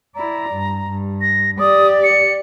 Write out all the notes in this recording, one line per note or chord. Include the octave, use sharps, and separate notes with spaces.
E4 D5 A#5
G2
G2
A#6
G4 D5 D#6
C#7